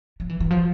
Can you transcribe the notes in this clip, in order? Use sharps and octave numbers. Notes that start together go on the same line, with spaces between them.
F3
E3
E3
F3